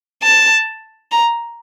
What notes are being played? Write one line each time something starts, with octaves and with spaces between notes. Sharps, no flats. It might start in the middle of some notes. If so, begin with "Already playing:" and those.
A5
A#5